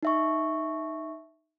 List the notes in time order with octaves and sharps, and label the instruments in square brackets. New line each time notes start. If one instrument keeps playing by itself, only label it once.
[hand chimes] D#4 E5 C#6